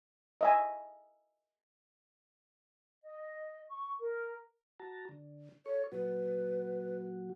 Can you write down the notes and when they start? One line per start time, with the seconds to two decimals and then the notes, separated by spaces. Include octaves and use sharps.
0.41 D#5 E5 G#5
3.02 D#5
3.68 C#6
4.00 A#4
4.80 F#4 A5 A#5
5.09 D3
5.66 A4 C#5 C#6
5.92 A#2 F#3 F#4 B4